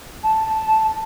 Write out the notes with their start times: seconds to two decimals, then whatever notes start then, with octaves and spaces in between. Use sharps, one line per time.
0.23 A5